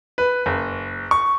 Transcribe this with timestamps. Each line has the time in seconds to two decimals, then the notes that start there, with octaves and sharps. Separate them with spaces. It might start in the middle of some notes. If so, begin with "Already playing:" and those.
0.18 B4
0.46 F#1
1.11 C#6